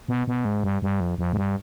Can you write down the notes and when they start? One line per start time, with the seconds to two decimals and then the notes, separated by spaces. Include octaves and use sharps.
0.08 B2
0.27 B2
0.45 G#2
0.63 G2
0.82 G2
1.00 F2
1.18 F2
1.33 G#2
1.37 G2